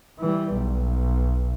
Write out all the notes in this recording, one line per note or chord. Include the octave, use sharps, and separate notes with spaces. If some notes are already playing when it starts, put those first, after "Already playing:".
E3 G3
B1